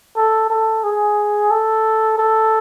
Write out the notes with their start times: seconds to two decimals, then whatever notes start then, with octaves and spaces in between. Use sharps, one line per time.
0.17 A4
0.50 A4
0.84 G#4
1.51 A4
2.18 A4